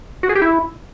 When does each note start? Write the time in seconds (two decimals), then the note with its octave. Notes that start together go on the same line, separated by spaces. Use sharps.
0.23 F#4
0.29 G#4
0.35 G4
0.42 E4